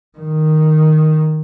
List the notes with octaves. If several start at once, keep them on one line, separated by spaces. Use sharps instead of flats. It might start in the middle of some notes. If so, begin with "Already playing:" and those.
D#3